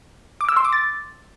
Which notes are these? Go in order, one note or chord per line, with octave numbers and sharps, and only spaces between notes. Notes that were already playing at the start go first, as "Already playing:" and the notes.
D6
E6
C6
D6
A6